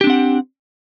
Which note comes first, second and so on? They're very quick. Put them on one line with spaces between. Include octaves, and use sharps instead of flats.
G4 D4 C4 F#5